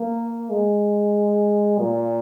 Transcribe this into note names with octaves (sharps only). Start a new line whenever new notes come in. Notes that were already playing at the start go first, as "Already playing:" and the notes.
Already playing: A#3
G#3
A#2